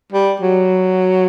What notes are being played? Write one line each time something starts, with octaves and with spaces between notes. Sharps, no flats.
G3
F#3